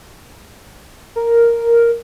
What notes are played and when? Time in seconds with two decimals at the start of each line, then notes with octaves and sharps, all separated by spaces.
1.16 A#4